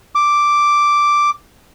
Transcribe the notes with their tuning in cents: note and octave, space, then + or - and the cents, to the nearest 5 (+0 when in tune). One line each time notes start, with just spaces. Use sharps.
D6 +0